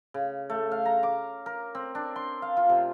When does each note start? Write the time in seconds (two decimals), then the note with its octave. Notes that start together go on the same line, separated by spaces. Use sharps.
0.14 C#3
0.50 A3
0.71 F5
0.85 A#5
1.03 D6
1.46 A#4
1.75 C4
1.95 D4
2.16 C6
2.42 F5
2.57 F4
2.69 C3